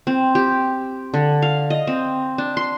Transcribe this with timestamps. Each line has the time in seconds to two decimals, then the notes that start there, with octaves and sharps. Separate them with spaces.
0.07 C4
0.35 G4
1.14 D3
1.42 F5
1.70 D#5
1.87 C4
2.38 D4
2.57 C6